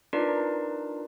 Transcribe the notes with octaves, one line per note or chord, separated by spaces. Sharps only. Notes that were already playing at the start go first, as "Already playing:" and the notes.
D4 D#4 F4 A#4 B4 D5